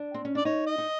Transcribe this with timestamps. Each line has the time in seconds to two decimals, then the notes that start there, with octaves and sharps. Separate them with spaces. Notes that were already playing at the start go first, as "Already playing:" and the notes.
Already playing: D4
0.14 C4
0.25 C#4
0.35 D4 D5
0.45 D#4 C#5
0.67 D#5
0.78 D#4